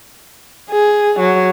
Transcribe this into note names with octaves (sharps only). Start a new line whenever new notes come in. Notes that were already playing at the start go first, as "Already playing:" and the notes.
G#4
F#3